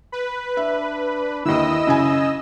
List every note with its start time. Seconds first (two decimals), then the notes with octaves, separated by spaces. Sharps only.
0.12 B4
0.57 D4 E5
1.45 D#2 D3 E4 D#5 E6
1.87 F#2 C#3 G#5